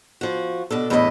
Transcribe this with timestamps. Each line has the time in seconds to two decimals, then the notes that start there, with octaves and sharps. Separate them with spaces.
0.21 F3 F#4
0.70 B2 D4 A4
0.90 E2 A2 D3 A4 D#5 E5